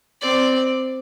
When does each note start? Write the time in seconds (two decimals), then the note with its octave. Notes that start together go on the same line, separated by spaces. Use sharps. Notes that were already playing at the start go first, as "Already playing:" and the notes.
0.22 C4 D5